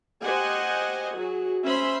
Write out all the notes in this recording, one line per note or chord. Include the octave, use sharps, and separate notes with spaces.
G4 C5 D#5 F#5 G#5
F#3 F#4 G#4
C#4 C5 E5 B5 C6